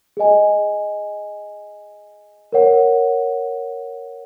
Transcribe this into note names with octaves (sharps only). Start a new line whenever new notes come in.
G#4 D#5 G#5
A#4 C#5 F#5